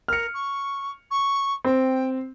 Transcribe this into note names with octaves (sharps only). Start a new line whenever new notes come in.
A#4 F6 C#7
C#6
C#6
C4 G5